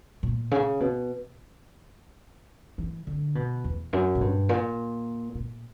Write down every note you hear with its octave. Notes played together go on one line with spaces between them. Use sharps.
A#2
C#3
B2
E3
D3
B2
E2
F#2
A#2
G2
A#2
A#2